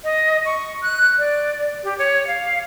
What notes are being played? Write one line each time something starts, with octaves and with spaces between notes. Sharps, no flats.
D#5
C#6
F#6
D5
G4
C#5
F5